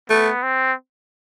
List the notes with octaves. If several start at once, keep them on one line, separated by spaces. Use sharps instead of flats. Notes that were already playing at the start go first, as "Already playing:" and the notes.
A3 B3
C4